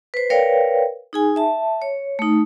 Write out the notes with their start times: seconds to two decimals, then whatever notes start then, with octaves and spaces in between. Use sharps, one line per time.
0.14 B4 C5
0.30 A#4 B4 C#5 D5 F5 G5
1.13 D#4 G#4 G#5
1.36 E5 A5
1.82 C#5
2.19 A3 D#4